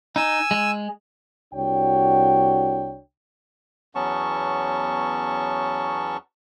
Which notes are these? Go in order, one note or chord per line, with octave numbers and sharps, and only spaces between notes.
D#4 G#5 E6
G#3
C2 D4 F#4 C#5 G5
E2 F#3 B3 C#4 A5 C#6